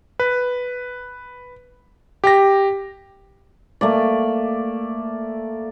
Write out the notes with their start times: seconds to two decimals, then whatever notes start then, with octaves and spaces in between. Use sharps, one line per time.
0.20 B4
2.24 G4 G5 A#6
3.81 A3 A#3 D5